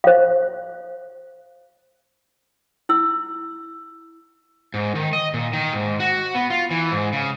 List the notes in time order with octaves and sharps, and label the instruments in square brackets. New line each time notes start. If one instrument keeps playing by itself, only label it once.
[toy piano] C5 F5
E4 E6
[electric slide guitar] G#2
D#3
D#5
A#2
D#3
G#2
F#4
B3
F4
E3
G#2
C#3